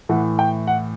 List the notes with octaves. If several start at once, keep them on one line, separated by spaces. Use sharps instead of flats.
A2 E3 F#5
G5
F#5